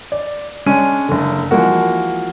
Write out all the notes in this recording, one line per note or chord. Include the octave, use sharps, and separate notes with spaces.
D5
G#3 C#4 D4 D#7
F#1 D3
E3 F3 G#3 A#3 F#4